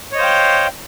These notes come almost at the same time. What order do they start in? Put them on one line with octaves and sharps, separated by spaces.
C#5 D#5 C5 F5 G5